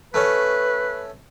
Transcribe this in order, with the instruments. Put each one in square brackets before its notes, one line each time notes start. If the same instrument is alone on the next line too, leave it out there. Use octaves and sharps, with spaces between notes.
[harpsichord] A3 C#4 [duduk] B4